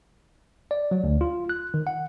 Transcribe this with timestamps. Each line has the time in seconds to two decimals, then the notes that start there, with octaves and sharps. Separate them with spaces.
0.71 D5
0.91 F#3
1.04 D2
1.21 F4
1.49 F#6
1.74 D#3
1.87 F#5